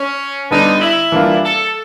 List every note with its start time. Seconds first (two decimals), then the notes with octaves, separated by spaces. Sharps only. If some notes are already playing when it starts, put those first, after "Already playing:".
Already playing: C#4
0.51 D3 G3 B3 D4 D#4
0.81 E4
1.12 E3 G3 A#3 D4 F4
1.44 A4